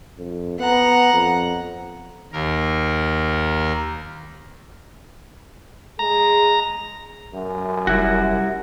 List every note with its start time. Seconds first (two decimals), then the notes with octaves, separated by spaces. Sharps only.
0.18 F2
0.60 B3 F#5 A#5
1.13 F2
2.32 D#2 A#4
5.99 G#3 G#4 A#5
7.34 F#2
7.87 F1 G3 E4 F#4